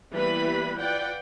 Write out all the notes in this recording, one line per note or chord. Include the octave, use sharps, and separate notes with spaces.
E3 G3 A#3 B3 B4 B5
F4 B4 D5 F#5 G5